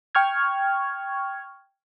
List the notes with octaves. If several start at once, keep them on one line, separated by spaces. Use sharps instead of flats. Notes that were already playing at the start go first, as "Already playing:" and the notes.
G5 C#6 F6 G#6